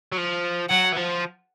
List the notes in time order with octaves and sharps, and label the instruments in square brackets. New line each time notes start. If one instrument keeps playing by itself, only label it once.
[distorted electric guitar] F#3
F3
[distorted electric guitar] F#3 [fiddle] F#5
[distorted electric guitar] E3
F3